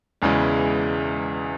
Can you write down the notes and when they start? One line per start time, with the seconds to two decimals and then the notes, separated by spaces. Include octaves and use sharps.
0.22 E1 E2 C#3 E3 G#3